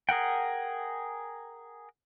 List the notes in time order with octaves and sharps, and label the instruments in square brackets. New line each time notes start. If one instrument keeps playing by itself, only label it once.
[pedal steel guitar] G#4 A#4 F#5 G5